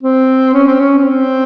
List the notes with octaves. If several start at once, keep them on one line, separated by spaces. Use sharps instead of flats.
C4
C#4
C4
C#4
C#4
C4